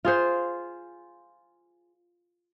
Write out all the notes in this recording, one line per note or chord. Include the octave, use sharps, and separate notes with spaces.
F4 G#4 C5